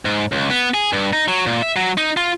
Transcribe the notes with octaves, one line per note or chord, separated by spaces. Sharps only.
G#2
C#2
B3
G#4
G2
D#4
F#3
A#2
E5
F#3
D#4
F4